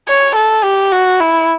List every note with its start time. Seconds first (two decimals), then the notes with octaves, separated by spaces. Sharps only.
0.08 C#5
0.36 A4
0.64 G4
0.92 F#4
1.21 E4